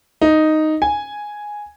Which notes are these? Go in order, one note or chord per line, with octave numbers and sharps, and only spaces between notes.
D#4
G#5